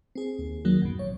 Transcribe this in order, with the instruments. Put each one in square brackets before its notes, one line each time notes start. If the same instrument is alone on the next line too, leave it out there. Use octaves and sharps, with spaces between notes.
[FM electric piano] C4 G#4
[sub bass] D#2
[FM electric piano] D#3 F#3 A#3
[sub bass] A1 [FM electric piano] F#2 B2
[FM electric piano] C#5